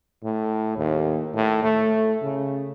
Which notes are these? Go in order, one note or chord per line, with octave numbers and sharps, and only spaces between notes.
A2
D#2
A2
A3
C#3